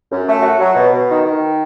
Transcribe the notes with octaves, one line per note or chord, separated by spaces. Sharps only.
F#2
A3
F#4
F#3
B2
B2
D#3
D#3